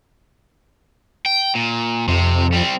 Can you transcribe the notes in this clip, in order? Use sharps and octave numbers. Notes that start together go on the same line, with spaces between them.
G5
A#2
F2 C3
G3 C4